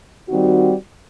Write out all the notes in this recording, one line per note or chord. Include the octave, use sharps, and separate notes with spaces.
D#3 G3 C4 D#4 F#4